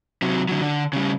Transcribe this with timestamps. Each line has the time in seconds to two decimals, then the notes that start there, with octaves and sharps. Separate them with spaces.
0.22 C3 F#3
0.49 D3 F#3
0.61 D3
0.93 C#3 G3